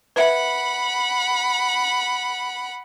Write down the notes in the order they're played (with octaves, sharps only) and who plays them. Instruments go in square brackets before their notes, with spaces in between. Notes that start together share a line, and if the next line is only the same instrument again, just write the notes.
[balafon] B4 E5 [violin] F#5 B5